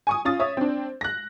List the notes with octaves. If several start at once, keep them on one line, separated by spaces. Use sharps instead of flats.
G#5 C#6 D#6
C#4 F4 D#6 A6
C#5 E5 D#6
C4 D4
F#6 A#6